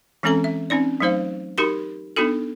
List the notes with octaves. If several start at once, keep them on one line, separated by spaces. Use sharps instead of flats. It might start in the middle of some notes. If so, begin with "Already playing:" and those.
E3 G#3 C4 C#4 A4 A#5
E5
C4 C#4 D#4 D5
F#3 A3 D#4 C5 F5
D#4 F#4 G4 A#4 B5 C6
B3 D4 D#4 F#4 A4